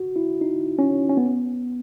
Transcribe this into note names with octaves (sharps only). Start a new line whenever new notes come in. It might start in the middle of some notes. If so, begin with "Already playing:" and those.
Already playing: F#4
E4
D#4
C#4
C#4
B3